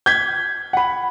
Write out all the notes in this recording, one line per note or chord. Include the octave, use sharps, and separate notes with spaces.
G6 G#6 B6
F#5 B5